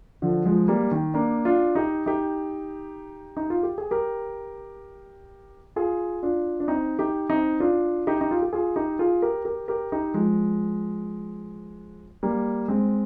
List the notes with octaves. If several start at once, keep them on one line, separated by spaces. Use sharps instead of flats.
D3 F3
F3 G#3
G3 A#3
D#3
A#3 D4
D4 F4
D#4 G4
D#4 G4
D#4
F4
G4
G#4
G4 A#4
F4 G#4
D4 F4
D4
C4 D#4
D#4 G4
C4 D#4
D4 F4
D#4 G4
D#4
F4
G4
F4 G#4
D#4 G4
F4 G#4
G4 A#4
G4 A#4
G4 A#4
D#4 G4
F3 G#3
G3 A#3
G#3 C4